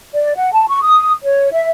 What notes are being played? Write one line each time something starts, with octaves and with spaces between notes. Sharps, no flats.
D5
F#5
A5
C#6
D#6
C#5
E5